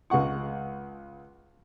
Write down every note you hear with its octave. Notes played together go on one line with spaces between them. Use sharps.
C#2 G#3 F#5 C#6